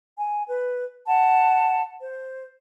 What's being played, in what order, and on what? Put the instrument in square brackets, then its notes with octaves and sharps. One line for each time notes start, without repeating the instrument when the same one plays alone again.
[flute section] G#5
B4
F#5 A5
C5